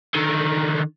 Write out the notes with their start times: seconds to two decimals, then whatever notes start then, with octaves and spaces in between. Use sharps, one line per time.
0.15 D3 D#3